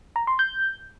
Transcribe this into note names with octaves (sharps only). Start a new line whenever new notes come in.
A#5
C6
G6